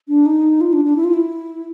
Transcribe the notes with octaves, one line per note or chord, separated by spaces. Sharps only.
D4
D#4
F4
D4
D4
E4
F4
E4